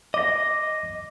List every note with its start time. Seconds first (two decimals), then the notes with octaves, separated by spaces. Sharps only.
0.14 D#5 D6 A#6